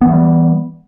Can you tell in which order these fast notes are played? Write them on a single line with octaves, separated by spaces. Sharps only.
B3 E3 A3 G3